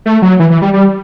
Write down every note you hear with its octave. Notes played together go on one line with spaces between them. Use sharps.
A3
F#3
E3
E3
G3
G3